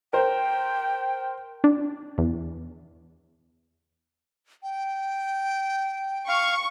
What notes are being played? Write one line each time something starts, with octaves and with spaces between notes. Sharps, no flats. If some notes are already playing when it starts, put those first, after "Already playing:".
A#4 C5 G5
D4
E2
G5
F5 C#6